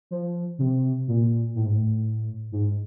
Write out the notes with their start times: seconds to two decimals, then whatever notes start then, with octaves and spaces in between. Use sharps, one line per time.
0.11 F3
0.59 C3
1.08 A#2
1.55 A2
1.66 G#2
1.75 A2
2.52 G#2